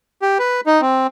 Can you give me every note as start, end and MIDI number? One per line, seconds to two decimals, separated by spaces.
0.22 0.38 67
0.39 0.61 71
0.66 0.81 63
0.81 1.07 60